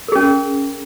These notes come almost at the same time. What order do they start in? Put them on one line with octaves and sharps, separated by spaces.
A#4 G#4 C#4